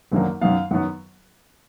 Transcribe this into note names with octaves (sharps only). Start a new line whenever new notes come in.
G#1 F#2 D3 F#3 A#3
F#2 D#3 F#3 B3 F5
F#2 D#3 F#3 B3 F#5